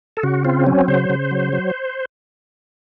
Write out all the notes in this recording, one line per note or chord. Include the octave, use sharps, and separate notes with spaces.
A4
C#3 F#4
C4 F4
F#3 C#4
C#3 C5
C#3
F#3
F#3